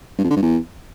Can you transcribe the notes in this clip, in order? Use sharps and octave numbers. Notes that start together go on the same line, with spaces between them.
G2
F2
D3
G2
E2